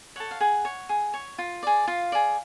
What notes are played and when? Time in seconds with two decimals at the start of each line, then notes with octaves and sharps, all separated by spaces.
0.16 A4 C#5 F#5
0.31 F5
0.40 G#4 F#5
0.65 C#5
0.89 G#4
1.14 C#5
1.38 F4
1.63 G#4 D5
1.87 F4 F5
2.12 G#4 D5